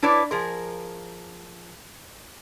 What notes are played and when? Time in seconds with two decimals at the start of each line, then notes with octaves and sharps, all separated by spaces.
0.02 D4 E4 B4 C#5 D5
0.31 F3 G#4 A#4